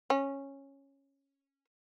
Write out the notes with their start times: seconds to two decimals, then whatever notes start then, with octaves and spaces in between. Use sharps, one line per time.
0.10 C#4